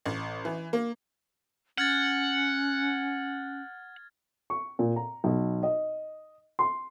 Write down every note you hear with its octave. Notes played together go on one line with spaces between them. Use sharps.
A1
E3
A#3
C#4 F#5 F6 G#6 A6
C#6
A#2
A#5
B1
D#5
C6